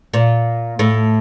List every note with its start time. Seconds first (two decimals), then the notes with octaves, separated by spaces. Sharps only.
0.14 A#2
0.79 A2